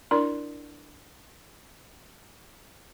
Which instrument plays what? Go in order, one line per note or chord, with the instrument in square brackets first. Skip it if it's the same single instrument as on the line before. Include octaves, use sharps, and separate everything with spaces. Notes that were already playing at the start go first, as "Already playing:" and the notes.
[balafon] D4 E4 A#4 D5 C6